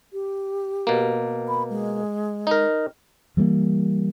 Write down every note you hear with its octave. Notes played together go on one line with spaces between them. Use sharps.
G4
B2 A#3
B5
G#3
D#4 A#4
E3 G3 A3 A#3